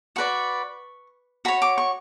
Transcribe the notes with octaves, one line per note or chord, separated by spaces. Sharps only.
F#4 B4 D5 C#6
F#4 C#5 B5
D6
C#6